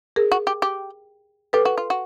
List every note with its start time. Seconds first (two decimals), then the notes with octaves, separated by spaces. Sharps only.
0.16 G#4 A#4
0.32 F#4
0.47 G4
0.62 G4
1.53 G4 A4 B4
1.65 F#4
1.78 F4
1.90 F#4